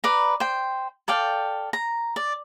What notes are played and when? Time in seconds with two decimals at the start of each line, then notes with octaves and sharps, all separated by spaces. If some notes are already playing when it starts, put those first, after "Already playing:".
0.04 B4 D5 A#5
0.40 C5 G5
1.08 A4 D5 F5 G5
1.73 A#5
2.16 D5